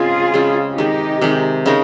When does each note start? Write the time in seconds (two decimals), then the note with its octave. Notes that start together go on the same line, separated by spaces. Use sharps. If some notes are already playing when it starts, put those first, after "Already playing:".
Already playing: C#3 G#3 C4 F4 G#4
0.34 C#3 G#3 C4
0.78 C3 D#3 G#3 D#4 G4
1.21 C3 D#3 G#3
1.66 C#3 G#3 D#4 A#4